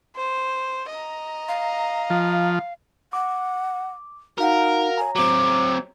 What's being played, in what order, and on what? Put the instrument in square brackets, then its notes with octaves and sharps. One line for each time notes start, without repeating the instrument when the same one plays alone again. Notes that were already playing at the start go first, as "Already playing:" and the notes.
[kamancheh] C5
D#5 A#5
[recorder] F5
[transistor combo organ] F3
[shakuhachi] F#5 [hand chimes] D6
[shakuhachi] D#4 [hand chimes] F#4 F5 F#5 [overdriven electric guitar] A#4
[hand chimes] C#5 A#5 [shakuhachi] G#5
[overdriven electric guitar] F#3 C4 [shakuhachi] D6